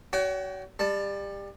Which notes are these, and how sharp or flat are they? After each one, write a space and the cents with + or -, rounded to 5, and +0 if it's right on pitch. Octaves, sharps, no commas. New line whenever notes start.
F#4 +30 C#5 +40 G5 +0
G3 +25 A5 +0